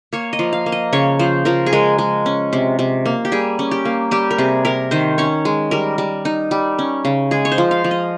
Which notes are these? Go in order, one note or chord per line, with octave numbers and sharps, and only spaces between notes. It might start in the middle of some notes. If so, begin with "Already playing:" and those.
A#3 C#5
D#5
F3
F5
A#3
D#5
C#3 C#5
F3 C5
F3 A#4
G#4
G#3 A#4
G#3
C#4
C3
C3
A#3
G4
G3 G#4
C#4
G4
A#3
G3 G4
A#4
C3 G#4
C3 A#4
D#3 C5
C#4 C#5
G#3
G3 A#4
G3
D#4
G3
C#4
C#3
G#3 G#4
C#5
C5
F3
F5
F3
D#5